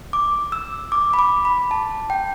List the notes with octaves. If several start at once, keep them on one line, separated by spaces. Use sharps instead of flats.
D6
E6
D6
B5
D6
B5
A5
G5